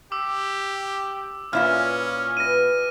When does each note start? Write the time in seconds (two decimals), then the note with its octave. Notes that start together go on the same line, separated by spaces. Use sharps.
0.12 G4 D6 E6
1.53 A#2 B3 C#4 E4 F4 B4 F6
2.37 E3 G3 B3 A#6 D#7